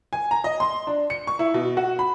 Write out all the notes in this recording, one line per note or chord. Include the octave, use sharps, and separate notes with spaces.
G#5
A#5
D#5
C6
D4
C#7
C#6
E4
B2
F#4
B5